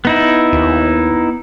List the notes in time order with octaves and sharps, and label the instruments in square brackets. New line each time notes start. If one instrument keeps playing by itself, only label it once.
[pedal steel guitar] B3 D#4 E4
[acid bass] D#2